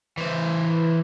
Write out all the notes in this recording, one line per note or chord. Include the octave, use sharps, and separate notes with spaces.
E3 C5